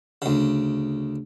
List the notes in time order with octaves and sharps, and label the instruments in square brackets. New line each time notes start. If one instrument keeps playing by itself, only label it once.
[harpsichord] D2 C#3